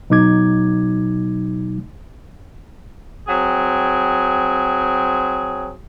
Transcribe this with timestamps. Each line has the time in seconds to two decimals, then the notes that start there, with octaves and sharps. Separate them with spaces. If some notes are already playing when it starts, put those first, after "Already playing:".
0.10 B2 F#3 D#4 D6 G#6
3.28 F#3 C4 G#4 G5